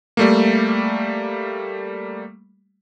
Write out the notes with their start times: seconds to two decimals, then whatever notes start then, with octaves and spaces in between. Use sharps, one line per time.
0.17 G3 A3 A#3